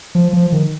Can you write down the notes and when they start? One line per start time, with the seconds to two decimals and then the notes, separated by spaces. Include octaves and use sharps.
0.15 F3
0.33 F3
0.52 D#3